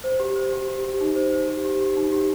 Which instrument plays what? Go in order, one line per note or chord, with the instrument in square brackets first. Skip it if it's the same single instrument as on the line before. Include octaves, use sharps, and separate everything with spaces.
[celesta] C5
G4
C5
G4
G4
G4
D#4
C5
C5
G4
G4
G4
D#4
G4